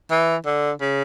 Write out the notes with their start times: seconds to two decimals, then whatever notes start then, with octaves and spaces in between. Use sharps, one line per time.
0.11 E3
0.46 D3
0.81 C#3